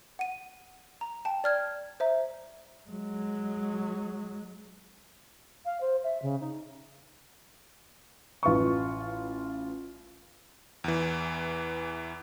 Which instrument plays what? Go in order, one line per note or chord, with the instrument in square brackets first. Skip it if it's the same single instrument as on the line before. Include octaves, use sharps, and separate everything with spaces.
[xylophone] F#5 D#7
A#5
G5 A5
D5 F6 G#6
C5 E5 A#5
[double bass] F#3 G#3
[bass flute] F5
C5
E5
C#3
D#4
[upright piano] A1 F4 B4 C#6
[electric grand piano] E2 E3